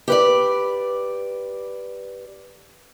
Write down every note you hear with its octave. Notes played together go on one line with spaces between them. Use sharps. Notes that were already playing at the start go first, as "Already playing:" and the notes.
G4 B4 D5